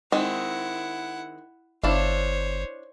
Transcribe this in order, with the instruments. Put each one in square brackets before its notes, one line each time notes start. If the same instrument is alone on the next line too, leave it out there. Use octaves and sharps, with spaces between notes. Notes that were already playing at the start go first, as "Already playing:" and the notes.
[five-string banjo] D#3 G#3 C4 [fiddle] E4 F#5
[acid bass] G1 [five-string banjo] D4 E4 F5 [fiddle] C5 C#5